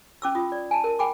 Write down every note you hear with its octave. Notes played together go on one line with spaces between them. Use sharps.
C#4 D6 E6
F4 D#6
D5
G#5 A5
A#4
G5 G#5 B5 D6